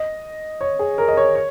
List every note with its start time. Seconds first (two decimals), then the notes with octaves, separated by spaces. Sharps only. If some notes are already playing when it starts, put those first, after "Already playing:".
Already playing: D#5
0.61 C#5
0.79 G#4
0.98 A#4
1.08 D#5
1.17 C#5
1.35 C#5